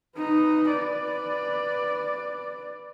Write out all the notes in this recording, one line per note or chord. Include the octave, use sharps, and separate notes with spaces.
D#4 B4
B4 D5